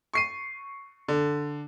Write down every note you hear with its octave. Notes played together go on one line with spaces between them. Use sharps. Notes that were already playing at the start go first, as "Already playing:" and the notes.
C#6 C7 D#7
D3